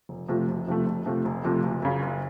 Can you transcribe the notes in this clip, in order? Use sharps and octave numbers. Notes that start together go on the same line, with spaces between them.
F1
F2 C3 F3 A3
F1
F2 C3 F3 A3
F1
F2 C3 F3 A3
F1
F2 C3 F3 A3
F#1
F#2 C#3
F#1